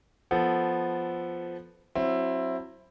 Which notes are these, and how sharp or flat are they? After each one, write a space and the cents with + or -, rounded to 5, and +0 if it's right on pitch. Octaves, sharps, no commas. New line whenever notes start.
F3 +0 B3 +0 A4 +0
F#3 +0 C4 +20 E4 +10